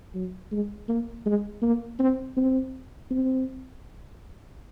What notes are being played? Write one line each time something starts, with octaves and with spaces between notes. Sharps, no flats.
F#3
G#3
A#3
G#3
A#3
C4
C4
C4